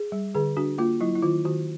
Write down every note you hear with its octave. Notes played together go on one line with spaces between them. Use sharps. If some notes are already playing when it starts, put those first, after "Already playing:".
Already playing: G#4
G3
D3 G#4
D4 F#4
A#3 F4
F#3 E4
E4
D#3 F4
D#3 F#4